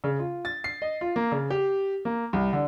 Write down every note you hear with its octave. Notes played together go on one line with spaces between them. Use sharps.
C#3
F4
A6
C7
D#5
F4
A#3
C#3
G4
A#3
C2
D3